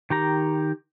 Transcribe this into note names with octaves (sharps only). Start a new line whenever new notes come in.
D#3 G4 A#5